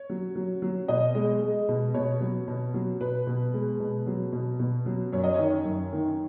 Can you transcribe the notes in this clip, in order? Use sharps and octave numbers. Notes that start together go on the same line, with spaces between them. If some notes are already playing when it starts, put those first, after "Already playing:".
Already playing: C#5
F#3
F#3
F#3
B2 D#5
G#3
G#3
B2
B2 C#5
F#3
B2
F#3
B2 B4
B2
G#3
B2
F#3
B2
B2
F#3
F#2 C#5
D#5
D#3 C#5
F#2
D#3